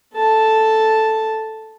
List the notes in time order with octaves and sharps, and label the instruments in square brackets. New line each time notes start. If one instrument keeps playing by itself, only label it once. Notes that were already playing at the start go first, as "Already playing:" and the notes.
[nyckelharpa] A4 A5